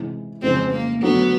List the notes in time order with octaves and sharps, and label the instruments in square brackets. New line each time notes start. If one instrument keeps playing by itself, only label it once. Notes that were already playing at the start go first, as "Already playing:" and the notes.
Already playing: [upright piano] C3 E3 G#3
[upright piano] F2 C#3 E3 G#3 C#4 [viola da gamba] C4
[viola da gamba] A#3
[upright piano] D3 F#3 A3 D4 [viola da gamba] B3